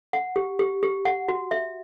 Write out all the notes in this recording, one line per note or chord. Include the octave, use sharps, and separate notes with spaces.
F#5
G4
G4
G4
F#5
F#4
E5